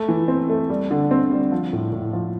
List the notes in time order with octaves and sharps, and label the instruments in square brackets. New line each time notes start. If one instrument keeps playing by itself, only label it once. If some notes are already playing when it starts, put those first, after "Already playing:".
Already playing: [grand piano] A3
E3
C4
A3
G3
D3
C4
G3
F3
A2
A2
F3